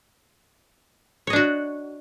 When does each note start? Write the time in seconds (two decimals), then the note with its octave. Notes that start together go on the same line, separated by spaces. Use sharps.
1.27 C#5
1.30 D#5
1.33 D4
1.36 F#4